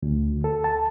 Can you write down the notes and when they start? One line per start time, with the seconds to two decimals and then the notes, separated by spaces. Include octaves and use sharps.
0.03 D2
0.44 A4
0.64 A5